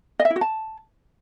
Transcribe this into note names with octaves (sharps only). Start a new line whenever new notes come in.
D#5
E5
E4
F#4
A5